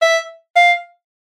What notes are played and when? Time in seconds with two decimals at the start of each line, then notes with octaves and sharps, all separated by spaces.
0.02 E5
0.56 F5